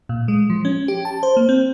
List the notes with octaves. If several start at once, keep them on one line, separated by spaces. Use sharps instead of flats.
A#2
G#3
F3
C#4
G4
A5
C5
A#3
C4